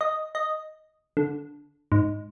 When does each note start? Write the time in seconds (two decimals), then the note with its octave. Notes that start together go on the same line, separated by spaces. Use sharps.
0.01 D#5
0.35 D#5
1.17 D3
1.92 G#2